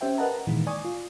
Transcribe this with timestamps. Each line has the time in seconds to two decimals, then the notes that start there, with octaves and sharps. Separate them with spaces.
0.01 C#4 G4 C5 E5 G5
0.18 A#4 B4 D#5 F#5 A5 A#5
0.47 A#2 D#3 E3 G#3
0.67 D5 G#5 C#6 D#6
0.85 F4